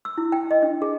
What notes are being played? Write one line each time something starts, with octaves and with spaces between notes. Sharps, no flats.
E6
E4
G5
D#5
D4
G#4